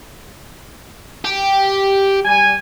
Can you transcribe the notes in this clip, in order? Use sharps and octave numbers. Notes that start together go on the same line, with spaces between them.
G4
G3 G#5